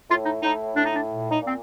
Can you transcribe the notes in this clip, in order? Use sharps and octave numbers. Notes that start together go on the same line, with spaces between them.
A2 F4
D#4
A2 D#4
A2 D4
D#4
D4
A#2
D#4
A#2
C4